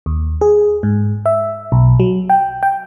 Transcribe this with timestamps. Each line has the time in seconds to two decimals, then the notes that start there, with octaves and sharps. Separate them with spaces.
0.06 D#2
0.41 G#4
0.83 G#2
1.26 E5
1.72 B1
2.00 F#3
2.30 G5
2.63 G5